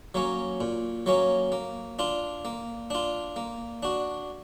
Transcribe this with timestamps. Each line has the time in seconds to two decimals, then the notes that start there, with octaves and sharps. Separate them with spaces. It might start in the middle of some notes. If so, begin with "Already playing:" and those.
0.14 F#3 A#3 C#4
0.60 A#2
1.06 F#3 A#3 C#4
1.52 A#3
1.99 D4 F4
2.45 A#3
2.90 D4 F4
3.36 A#3
3.83 D4 F#4